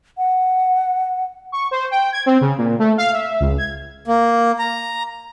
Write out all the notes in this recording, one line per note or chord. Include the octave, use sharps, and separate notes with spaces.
F#5
C#6
C5
G5
G#6
C4
C#3
A#2
A3
F5
E5
C#2
G#6
A#3
A#5